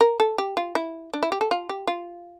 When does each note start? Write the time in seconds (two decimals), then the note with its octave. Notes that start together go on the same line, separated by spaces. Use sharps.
0.01 A#4
0.20 A4
0.38 G4
0.57 F4
0.75 E4
1.13 D4
1.23 E4
1.32 G4
1.41 A4
1.51 F4
1.69 G4
1.87 F4